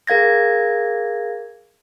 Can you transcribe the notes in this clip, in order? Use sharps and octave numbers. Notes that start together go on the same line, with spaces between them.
G#4 A#4 F5 G#6 A#6